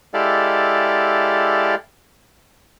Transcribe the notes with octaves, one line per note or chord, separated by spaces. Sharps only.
G#3 E4 G4 A4 D5 F5